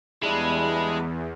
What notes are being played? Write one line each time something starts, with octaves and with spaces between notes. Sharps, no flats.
E2 G3 G#3 D4 E4